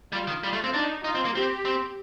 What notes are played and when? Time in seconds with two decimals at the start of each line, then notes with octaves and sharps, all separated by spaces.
0.12 G3 F4
0.27 D#3
0.43 G3 F4
0.53 A3
0.64 C4
0.73 D4 D#4
1.04 D#4 F4
1.15 C4
1.25 A#3
1.35 C4 G4
1.65 C4